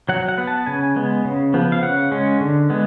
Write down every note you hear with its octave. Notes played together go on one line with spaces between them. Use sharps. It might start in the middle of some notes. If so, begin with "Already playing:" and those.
F#3 F#5
F#5
B3
A5
C#3 G#5
G#3 B3
C#3
F3 B3
F5
C#3 F#5
G#3 C#4
D3
G#3 B3